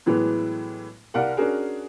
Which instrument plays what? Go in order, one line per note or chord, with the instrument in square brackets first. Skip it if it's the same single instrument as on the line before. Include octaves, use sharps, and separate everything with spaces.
[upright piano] A2 E3 F#3 G#3 B3
C2 A#4 D5 F5 F#5
C#4 D4 F#4 G#4 A#4